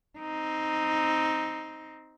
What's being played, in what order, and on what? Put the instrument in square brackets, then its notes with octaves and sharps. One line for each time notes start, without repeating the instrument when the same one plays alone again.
[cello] C4 D#4